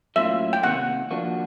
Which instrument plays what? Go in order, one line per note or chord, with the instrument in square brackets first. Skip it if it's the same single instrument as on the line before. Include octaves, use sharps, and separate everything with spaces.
[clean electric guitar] A2 F#3 A#3 C#4 F4 [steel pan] E5
[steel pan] G5
[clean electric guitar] C3 D#3 G3 A#3 [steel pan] F#5
[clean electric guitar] F3 A#3 D4 F#4